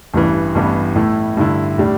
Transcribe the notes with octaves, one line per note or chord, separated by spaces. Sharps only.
A1 G2 E3
A1 G2 E3 B3
A2 A3 E4
G2 D3 A3 E4
A2 G3 D4